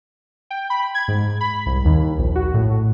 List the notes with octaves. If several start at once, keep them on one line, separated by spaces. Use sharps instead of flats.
G5
B5
G#6
G#2
B5
C2
D#2
A#1
F#4
A2